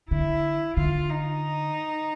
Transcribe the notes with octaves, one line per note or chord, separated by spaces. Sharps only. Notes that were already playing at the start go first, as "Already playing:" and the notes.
D3 E4
D3 F4
D#4